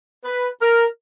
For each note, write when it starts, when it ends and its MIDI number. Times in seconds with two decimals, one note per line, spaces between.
0.25 0.50 71
0.62 0.85 70